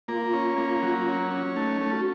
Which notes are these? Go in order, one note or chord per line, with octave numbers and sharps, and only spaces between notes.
A#3 F4
C#4
A#3
F#3
C#4
C#4
A3 D#4
A3
F#4